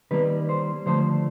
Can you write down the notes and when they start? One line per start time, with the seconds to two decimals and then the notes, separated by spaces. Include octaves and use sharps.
0.11 D#3 G3 A#3 B4
0.49 C5
0.86 D3 F3 A3 C5